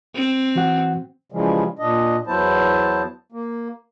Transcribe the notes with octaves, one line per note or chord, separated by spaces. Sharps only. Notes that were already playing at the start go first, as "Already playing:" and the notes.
C4
E3 F#4 F#5
C#3 E3 F3 G3 G#3
A#2 D4 D#5
E2 F#3 B3 E4 C5 A5
A#3